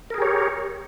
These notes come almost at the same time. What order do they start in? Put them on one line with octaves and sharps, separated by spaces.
A#4 G#4 G4 C#5